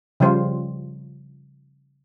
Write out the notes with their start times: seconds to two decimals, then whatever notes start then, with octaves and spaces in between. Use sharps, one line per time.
0.20 C#3 F3 G3 F4 C5